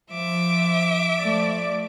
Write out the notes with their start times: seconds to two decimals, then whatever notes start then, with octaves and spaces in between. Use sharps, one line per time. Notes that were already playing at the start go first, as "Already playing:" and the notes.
0.12 F3 E5 D6
1.22 F3 A3 D5